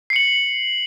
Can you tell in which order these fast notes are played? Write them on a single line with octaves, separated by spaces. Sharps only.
C7 C#7 F#7